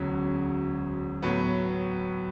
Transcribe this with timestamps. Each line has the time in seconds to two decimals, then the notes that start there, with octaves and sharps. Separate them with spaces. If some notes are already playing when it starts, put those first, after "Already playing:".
Already playing: E1 D2 C#3 F#3
1.22 A2 F#3 B3